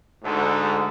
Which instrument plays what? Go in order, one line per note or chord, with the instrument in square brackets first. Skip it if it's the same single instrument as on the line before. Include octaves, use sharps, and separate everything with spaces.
[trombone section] D2 G#2 A4